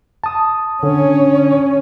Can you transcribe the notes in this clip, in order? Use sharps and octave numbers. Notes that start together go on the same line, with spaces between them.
A5 D#6
D3 C#4 C#5